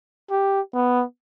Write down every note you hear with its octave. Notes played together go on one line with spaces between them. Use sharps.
G4
B3